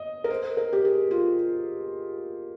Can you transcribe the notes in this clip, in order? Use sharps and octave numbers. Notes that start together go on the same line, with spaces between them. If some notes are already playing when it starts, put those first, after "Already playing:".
Already playing: D#5
A#4
C5
A#4
G4
G#4
F4